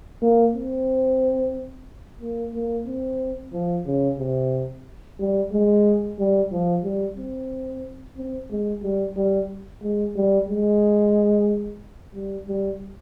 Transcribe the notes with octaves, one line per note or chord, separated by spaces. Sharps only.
A#3
C4
A#3
A#3
C4
F3
C#3
C3
G3
G#3
G3
F3
G3
C4
C4
G#3
G3
G3
G#3
G3
G#3
G3
G3